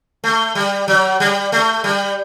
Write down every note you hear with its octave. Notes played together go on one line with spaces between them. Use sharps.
A3
G3
F#3
G3
A3
G3